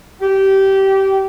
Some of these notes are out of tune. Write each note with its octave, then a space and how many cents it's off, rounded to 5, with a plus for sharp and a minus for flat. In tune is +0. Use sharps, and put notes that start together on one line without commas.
G4 -20